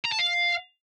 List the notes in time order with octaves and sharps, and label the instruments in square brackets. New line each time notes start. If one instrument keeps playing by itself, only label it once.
[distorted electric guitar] A#5
A5
F5